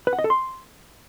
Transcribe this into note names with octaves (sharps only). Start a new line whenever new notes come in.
B4
F#5
D#5
A4
C6